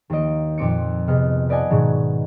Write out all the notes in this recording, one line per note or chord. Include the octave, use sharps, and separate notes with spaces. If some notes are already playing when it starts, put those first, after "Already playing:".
D#2 D#3 A#3 D#5 D7
F2 A#2 C4 D6 C#7
C3 B3 G#4 D#5 F6
B4 D5 D#5 F#5 G#5 A5
G#2 B2 D#3 F#3